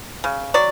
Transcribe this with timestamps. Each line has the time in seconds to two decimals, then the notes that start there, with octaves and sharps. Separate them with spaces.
0.24 C#3
0.54 F#3 D5